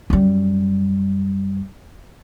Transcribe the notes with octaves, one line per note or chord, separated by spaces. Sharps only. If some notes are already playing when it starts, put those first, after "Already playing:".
F#2 G3